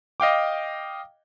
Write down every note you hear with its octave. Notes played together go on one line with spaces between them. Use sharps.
D#5 F5 G5 D6